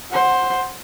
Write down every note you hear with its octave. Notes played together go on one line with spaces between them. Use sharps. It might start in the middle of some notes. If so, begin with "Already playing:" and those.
C5 F#5